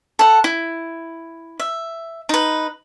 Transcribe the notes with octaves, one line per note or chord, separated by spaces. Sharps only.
A4 F#5
E4
E5
D#4 B4